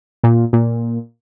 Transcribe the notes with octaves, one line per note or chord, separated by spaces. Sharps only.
A#2
A#2